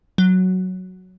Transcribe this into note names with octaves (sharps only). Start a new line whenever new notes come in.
F#3